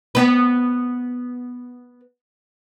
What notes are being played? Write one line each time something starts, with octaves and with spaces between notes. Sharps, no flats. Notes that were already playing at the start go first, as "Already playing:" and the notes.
B3 B4